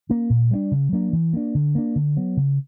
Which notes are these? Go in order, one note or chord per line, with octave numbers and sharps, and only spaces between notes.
A#3 C#4
A#2
G3 B3 D4
C#3
F#3 A#3 D4
E3
A#3 D4
D3
A#3 D4
D3
F#3 B3
C#3